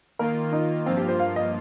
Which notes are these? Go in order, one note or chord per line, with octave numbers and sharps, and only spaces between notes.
D#3 A#3 F4 A#4
D#4
G2 F3 A#3 C4 F4
G4
C5
F5
D#5